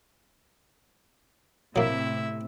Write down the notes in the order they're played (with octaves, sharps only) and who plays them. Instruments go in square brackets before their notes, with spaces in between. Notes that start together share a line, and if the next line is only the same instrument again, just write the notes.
[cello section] A2 C3 [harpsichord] F#3 A#3 [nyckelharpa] E4 E5